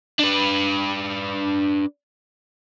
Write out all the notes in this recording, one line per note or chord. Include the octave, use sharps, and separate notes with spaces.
D4 B4